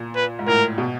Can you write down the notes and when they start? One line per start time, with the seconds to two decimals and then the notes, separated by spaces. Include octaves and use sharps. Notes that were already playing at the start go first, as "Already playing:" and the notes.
Already playing: A#2
0.15 B4
0.39 G#2
0.47 A2 A#4
0.78 B2